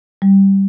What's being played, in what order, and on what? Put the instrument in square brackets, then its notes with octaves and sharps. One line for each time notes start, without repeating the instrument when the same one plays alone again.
[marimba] G3